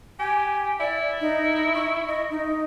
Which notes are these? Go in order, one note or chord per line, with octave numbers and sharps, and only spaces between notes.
G4 G#5
E4 D5
D#4
C#6
D#5
D#4